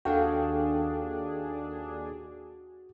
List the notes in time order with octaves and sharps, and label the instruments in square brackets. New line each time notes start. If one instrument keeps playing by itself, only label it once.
[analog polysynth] D#2 D4 G#4 [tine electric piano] F#4 [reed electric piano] A4 F5 G5